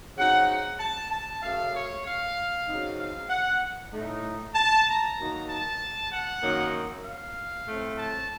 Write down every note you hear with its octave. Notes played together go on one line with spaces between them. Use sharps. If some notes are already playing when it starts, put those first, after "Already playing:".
C#3 F#3 C4 D#4 F#5
F#5
A5
A5
F#2 C#3 A3 F5
C#5
F5
C#3 F#3 C4 D#4
F5
F#5
A2 A3 D#4
A5
A#5
D#3 F#3 A#3 D#4
A5
F#5
F#2 D#3 F#3 A#3 D#4
F5
A2 A3 C4
A5